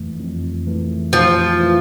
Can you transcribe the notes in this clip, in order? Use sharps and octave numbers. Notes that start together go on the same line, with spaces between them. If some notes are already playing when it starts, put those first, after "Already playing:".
Already playing: F2 E3 A3
F2
E3 A3
F2 F3
E3 A3